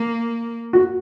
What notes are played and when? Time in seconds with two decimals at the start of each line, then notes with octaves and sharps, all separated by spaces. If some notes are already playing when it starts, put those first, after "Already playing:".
Already playing: A#3
0.73 F#4